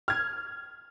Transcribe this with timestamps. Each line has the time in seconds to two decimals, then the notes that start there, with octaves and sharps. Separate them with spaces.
0.08 F6 G#6